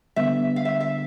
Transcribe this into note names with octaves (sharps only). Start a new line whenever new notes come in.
D3 G3 B3 E5
F5
E5
E5